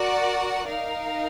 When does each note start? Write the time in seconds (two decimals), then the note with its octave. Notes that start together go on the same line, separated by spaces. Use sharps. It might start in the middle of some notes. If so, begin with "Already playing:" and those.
Already playing: F#4 A#4 D5 F#5
0.67 D#4 A#4 F5